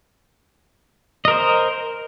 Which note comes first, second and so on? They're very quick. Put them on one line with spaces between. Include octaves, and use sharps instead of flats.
D#5 A#4 C5